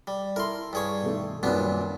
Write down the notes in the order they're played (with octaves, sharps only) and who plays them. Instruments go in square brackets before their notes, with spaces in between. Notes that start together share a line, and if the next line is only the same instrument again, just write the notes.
[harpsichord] G3
[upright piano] E4 A4 [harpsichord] A#4 C6
[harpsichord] G2 G#4 C#5
[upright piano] B2 D#3 A3
[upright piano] F#2 D#3 G3 [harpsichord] A#2 B3 D4